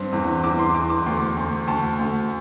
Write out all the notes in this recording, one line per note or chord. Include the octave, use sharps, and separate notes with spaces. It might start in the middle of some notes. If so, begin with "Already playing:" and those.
Already playing: G2 C4
E2
E2 D6
C6
E2 D6
D6
D2 C6
D2
D2 A5
D2